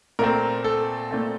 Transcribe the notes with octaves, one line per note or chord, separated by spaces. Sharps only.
A#2 A3 C4 A#4
A4
A#2 A3 C4